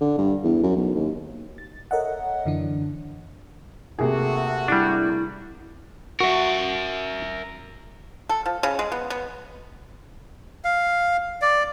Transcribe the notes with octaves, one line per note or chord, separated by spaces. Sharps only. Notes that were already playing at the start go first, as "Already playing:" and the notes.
D3
G2
E2
F#2
B1
D#2
A6
A4 A#4 C#5 D#5 E5 F#5
F#2 D3 E3 D4
C3 A3 A#3 F#4 G#4
G3 D4 E4
F#4 A#4 E5
A4
F3
C#3
G#3
B3
B3
F5
D5